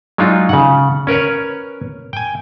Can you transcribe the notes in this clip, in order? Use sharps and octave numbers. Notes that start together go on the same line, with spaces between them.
F#3 G#3 D4 D#4 F4
C#3 F#5
C#4 A#4 B4 C#5
G5 G#5